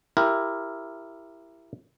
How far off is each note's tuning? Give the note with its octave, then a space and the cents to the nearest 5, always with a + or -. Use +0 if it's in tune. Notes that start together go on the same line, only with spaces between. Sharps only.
E4 +15 G4 +10 A#4 +0